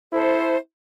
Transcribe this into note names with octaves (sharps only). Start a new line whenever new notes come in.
E4 A4 C5